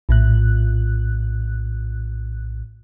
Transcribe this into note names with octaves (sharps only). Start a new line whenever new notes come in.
A#1 A2 F#6